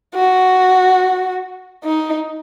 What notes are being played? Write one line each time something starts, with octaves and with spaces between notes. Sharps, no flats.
F#4
D#4